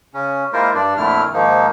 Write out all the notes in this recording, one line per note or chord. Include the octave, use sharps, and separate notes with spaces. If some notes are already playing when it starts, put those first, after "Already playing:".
C#3 C#4
G#3 A#3 E4 F4 A#4 C5
G2 D4 D5
F2 A#2 D3 A3 E4 F6
G#2 D#3 F3 A#3 D#4